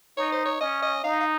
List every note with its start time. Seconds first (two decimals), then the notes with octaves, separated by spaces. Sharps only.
0.17 D#4 C#5
0.32 C5
0.46 C#5
0.61 C#4 D#5
0.83 D#5
1.04 D#4 F5
1.20 F5